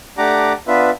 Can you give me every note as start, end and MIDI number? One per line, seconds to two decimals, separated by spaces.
0.18 0.53 57
0.18 0.53 62
0.18 0.53 67
0.18 0.53 78
0.18 0.53 82
0.18 0.53 86
0.67 0.90 59
0.67 0.90 62
0.67 0.90 65
0.67 0.90 71
0.67 0.90 76